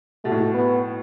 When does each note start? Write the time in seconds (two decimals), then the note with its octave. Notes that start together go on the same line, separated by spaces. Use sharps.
0.24 B2 A3
0.31 A2
0.39 B2
0.54 B3